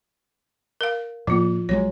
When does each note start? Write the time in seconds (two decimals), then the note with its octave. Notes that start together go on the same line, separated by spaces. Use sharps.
0.81 A#4 F5
1.27 A2 F3 A#3 F4
1.69 A#1 F#3 G#3 C#5